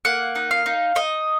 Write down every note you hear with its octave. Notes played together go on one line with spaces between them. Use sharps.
A#3 F#5
D#4
F5
D#4
D#4 D#5